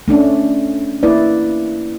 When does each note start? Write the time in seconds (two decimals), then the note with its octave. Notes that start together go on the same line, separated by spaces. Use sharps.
0.08 A3 C#4 D4
1.03 A#3 E4 B4 D5